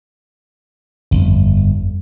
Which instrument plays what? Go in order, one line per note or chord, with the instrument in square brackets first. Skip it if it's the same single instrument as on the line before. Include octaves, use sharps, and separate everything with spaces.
[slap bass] G1 [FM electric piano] F2